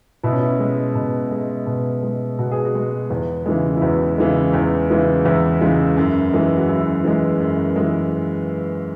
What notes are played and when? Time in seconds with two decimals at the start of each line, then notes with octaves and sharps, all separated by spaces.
0.23 B2 E4
0.32 C#4
0.40 E4
0.60 G#3
0.95 B2
1.31 G#3
1.66 B2
2.03 G#3
2.38 B2 F#4
2.51 G#4
2.65 F#4
2.75 G#3
3.10 E2
3.46 C#3 E3 G#3
3.77 E4
3.81 E2 F#4
4.18 C#3 E3 G#3
4.53 E2
4.90 C#3 E3 G#3
5.25 E2 E4
5.61 C#3 E3 G#3
5.97 F#2
6.33 E3 G#3
6.57 F#4
6.69 F#2 E4
7.04 E3 G#3
7.40 F#2
7.76 E3 G#3